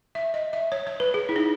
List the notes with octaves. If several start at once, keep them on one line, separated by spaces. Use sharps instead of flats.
E5
D#5
E5
C#5
C#5
B4
G#4
E4
D#4